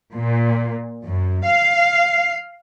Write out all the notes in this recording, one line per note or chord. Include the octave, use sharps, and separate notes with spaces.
A#2
F#2
F5